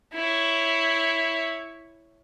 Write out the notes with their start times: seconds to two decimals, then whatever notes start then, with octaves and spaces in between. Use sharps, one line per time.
0.14 E4 C#5